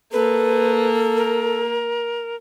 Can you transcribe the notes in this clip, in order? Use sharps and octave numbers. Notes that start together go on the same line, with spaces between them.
A#3 A4 B4
A#4